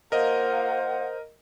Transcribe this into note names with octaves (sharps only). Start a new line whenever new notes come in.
A#3 F4 A#4 C5 D#5 F#5